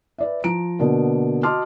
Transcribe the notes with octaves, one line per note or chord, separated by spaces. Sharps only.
B4 D5 E5
F3 A#5 D7
B2 D3 A#3 B3
F#4 D#5 A5 C6 D6 F6